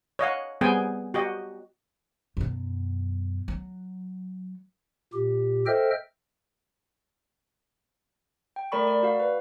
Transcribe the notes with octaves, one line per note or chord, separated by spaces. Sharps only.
C#5 D#5 F5 F#5
G3 B3 C4 G#4 G5 G#5
F#4 G4 D#5
F#2 B2
F#3
A#2 G4
A4 C5 D#5 E5 G5 F6
G5
A3 A#4 D5 B5 C#6
D5
F#4 F5
B4